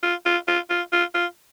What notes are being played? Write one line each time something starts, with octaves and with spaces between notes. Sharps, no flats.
F4
F4
F4
F4
F4
F4